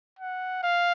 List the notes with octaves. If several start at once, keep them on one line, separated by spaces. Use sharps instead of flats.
F#5
F5